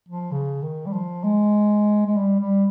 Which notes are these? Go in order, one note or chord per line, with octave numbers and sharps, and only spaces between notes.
F3
C#3
D#3
G3
F3
G#3
G#3
G3
G3